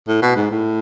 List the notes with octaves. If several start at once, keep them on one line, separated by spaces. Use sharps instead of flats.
A2
B2
G#2
A2